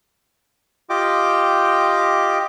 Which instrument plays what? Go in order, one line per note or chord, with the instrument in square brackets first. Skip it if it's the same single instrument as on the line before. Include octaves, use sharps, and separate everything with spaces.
[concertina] F4 G4 D#5 G5 D6